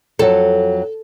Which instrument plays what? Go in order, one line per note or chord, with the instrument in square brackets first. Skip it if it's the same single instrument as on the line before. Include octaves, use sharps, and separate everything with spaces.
[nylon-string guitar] F2 F#3 [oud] A4